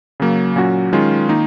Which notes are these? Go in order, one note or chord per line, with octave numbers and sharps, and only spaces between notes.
C#3 F#3 A#3
A#2 F#3 C#4 F#4
D#3 G#3 C#4 F4
D#3 A#3 D#4